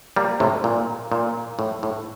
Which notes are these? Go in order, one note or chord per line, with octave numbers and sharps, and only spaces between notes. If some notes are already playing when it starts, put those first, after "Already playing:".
G3 A#3
A2 C3
A#2
A#2
A2
A2